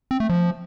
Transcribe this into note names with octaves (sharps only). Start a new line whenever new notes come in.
C4
A3
F3